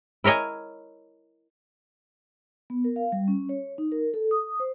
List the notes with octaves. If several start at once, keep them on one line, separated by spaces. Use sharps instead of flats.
E4 A#4 C#5 D#5 G#5
B3
A#4
F5
G3
C#4
C#5
D#4
A#4
A4
D#6
C5